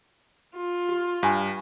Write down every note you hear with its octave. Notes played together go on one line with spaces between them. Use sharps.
F4
G4
G2 F5 G#5